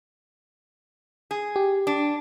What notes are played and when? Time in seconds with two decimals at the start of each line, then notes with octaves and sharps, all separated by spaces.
1.31 G#4
1.56 G4
1.87 D4